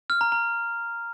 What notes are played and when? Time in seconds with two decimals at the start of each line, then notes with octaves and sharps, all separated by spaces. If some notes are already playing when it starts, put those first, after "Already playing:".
0.10 F6
0.21 A#5
0.32 A#5